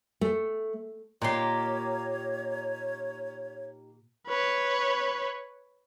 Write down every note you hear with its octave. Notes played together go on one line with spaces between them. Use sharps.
A3
A#2 D#3 A#3 G4 C#5 C6
B4 C#5